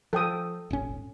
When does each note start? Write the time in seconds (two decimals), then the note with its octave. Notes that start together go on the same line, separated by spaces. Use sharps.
0.13 F3 A4 G5 D#6
0.71 D#1 G#1 C#4